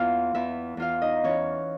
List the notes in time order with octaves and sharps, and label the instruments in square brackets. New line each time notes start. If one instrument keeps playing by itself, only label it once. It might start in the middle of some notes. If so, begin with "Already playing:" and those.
Already playing: [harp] E2 E3 F4 F5
E2 E4 E5
E2 F4 F5
D#4 D#5
E3 C#4 C#5